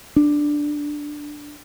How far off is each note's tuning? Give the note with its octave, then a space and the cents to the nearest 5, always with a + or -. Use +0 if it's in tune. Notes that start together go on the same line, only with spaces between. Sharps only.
D4 +5